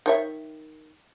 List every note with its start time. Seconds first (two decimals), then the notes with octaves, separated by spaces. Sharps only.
0.06 D#3 C#5 E5